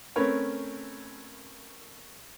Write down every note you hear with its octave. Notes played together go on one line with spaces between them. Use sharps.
A3 C4 C#4 A#4 B4 C#5